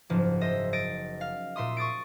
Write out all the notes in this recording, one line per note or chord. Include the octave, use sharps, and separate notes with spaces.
F#1 G#2 F3
C5 D#5 E5
D#5 A6 D7
F5
A#2 E5 C6 D#6
C#6 D#6 A6 D7